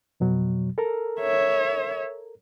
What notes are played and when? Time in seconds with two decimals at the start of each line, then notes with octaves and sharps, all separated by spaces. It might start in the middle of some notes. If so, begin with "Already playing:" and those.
0.20 F2 B2 F#3
0.78 A4 A#4 A#5
1.20 C#5 E5